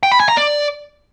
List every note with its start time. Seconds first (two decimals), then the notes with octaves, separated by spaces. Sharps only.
0.03 G5
0.12 B5
0.20 G#5
0.29 A#5
0.37 D5